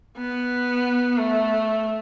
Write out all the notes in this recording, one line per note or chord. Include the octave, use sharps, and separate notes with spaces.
B3
A3